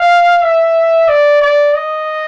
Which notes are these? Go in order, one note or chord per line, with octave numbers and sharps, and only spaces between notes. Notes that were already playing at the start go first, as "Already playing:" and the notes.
Already playing: F5
E5
D5
D5
D#5